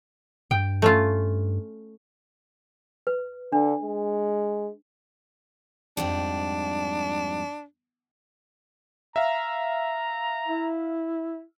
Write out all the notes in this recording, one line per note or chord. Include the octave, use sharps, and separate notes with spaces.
G2 G5
A3 C#4 F4
B4
D3 D4
G#3
F2 G#2 G3 D4
E5 F5 A#5
E4